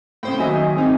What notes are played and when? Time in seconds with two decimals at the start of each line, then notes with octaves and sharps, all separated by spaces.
0.23 A2 C#3 C5 G5
0.39 D#3 F#3 A#3 D#5 E5 G#5
0.76 G#3 C4 D#4